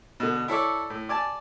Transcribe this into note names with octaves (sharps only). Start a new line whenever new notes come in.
B2 D3
E4 A4 C#5 D5
A2
D5 G#5 A5